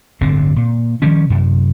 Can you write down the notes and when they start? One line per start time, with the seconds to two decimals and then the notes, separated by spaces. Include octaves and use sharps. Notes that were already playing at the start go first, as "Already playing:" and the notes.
0.21 D1 G1 D3 C4
0.56 A#2
1.02 D#3 F3 G3 C#4
1.30 F#2 C3